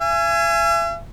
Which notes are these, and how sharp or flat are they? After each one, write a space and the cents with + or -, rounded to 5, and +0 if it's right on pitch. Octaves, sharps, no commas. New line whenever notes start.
E5 +45 G#5 +0